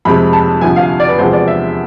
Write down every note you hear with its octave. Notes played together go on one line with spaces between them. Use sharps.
F2 C3 G#3 C4 B5
A5
D2 C3 F3 G#5
F5
D5
B4
E2 C3 F3 G#3 C5
D5
E5